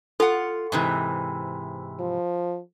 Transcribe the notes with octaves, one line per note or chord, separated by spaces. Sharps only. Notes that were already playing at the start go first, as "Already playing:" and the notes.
F4 A4 F#5
G#2 C3 E3
F3